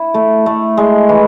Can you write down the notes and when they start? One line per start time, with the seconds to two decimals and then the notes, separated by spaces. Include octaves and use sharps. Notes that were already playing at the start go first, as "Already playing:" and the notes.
Already playing: E4
0.14 A3
0.46 A3
0.77 G#3
1.09 E3